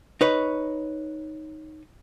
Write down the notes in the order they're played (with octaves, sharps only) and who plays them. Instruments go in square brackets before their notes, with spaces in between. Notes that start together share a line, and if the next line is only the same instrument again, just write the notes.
[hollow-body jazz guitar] D#4 B4 C#5